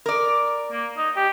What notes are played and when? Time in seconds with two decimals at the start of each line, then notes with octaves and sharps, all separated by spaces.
0.06 A#4 D5
0.72 A#3
0.97 D#4
1.16 G4